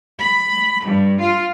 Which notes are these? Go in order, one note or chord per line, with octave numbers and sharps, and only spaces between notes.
B5
G2
F4